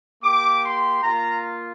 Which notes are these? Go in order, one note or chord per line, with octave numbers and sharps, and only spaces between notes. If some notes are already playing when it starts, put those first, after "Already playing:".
A#3 G4 D6
C6
A#3 F4 A#5